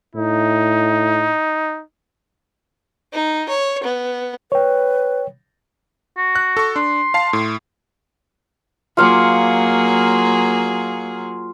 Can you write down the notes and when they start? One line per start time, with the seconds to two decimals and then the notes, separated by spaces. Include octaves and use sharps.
0.15 A2 D#4
3.13 D#4
3.49 C#5
3.83 B3
4.52 B4 C#5 G5
6.17 F#4
6.35 F#6
6.57 A4 C#6
6.76 D4 C6
7.14 F5 A5 C7
7.33 A2
8.97 F#3 A#3 F4 G#4 F5 D6